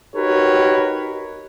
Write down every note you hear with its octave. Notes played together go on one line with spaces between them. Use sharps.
D#4 F#4 G4 A#4 B4 C#5